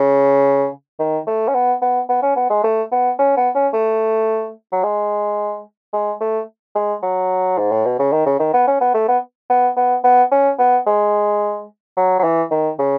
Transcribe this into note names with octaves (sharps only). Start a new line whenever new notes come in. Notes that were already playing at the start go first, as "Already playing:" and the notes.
Already playing: C#3
D#3
A3
C#4
B3
B3
B3
C#4
B3
G#3
A3
B3
C#4
B3
C#4
A3
F#3
G#3
G#3
A3
G#3
F#3
G#2
A2
B2
C#3
D#3
C#3
D#3
B3
C#4
B3
A3
B3
B3
B3
B3
C#4
B3
G#3
F#3
F#3
E3
D#3
C#3